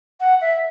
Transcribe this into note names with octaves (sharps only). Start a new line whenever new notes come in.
F#5
E5